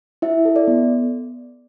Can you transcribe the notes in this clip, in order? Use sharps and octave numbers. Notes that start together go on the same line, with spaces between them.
E4 E5
A4
D5
B3